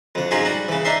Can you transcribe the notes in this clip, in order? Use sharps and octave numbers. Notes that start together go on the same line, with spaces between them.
F2 D3
G#2 F#3 C#4 F4 G#4
G3 F#4
C#3 E3
D4 D#4 E5 C6